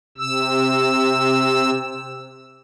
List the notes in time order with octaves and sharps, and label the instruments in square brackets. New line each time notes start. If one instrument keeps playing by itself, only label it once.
[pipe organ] C3 E6